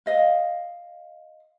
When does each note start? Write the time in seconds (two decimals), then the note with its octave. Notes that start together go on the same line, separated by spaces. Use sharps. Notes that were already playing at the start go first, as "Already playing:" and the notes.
0.06 D#5 F5